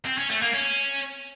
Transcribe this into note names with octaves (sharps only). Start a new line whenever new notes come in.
C4
C#4
A3
A#3
C#4